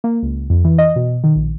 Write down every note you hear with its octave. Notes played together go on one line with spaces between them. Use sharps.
A#3
C#2
F2
E3
D#5
B2
D#3
A#1